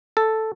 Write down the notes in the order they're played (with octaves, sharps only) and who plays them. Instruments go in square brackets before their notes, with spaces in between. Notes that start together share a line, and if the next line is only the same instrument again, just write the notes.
[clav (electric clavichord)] A4